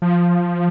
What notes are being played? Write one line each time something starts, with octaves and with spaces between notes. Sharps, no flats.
F3